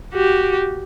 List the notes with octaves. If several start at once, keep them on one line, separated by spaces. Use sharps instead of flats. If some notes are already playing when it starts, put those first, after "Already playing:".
F#4 G4